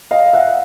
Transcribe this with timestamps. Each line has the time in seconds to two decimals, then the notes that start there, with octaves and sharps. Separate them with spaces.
0.11 D#5 F5
0.33 E5 F#5